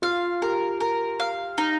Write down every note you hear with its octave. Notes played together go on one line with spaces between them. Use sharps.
F4 F5
G4 A#4
A#4
F5
D#4